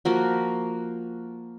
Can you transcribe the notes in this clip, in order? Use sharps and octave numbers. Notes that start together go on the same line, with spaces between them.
F3 A#3 F#4